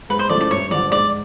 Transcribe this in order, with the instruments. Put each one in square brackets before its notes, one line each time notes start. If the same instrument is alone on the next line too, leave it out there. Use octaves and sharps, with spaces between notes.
[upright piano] G#2 [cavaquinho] B4
[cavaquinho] C5
[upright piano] F3 A3 C#4 E4 [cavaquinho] D5
[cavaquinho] D5
[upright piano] G2 [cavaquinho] C#5
[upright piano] D3 F3 [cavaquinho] D5
[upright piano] G#2 [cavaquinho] D5